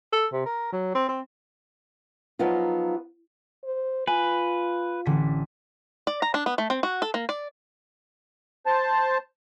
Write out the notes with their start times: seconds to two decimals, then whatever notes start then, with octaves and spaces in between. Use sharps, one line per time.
0.12 A4
0.33 C3
0.46 A#4
0.72 F#3
0.95 C4
1.09 C4
2.39 F3 F#3 B3 D#4 F4
3.64 C5
4.07 F4 B4 G#5
5.05 A1 D3 B6
6.07 D5
6.22 A#5
6.34 D4
6.46 B3
6.58 A3
6.70 C4
6.83 F#4
7.02 A4
7.14 A#3
7.29 D5
8.66 C5 A5